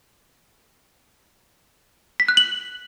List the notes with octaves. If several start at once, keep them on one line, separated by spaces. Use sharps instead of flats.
B6
F#6
F#7